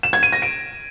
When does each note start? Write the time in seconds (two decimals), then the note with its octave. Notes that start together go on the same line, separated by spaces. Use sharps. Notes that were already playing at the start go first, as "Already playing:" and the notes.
0.03 E7
0.13 G#6
0.23 D#7
0.32 A#6
0.42 D7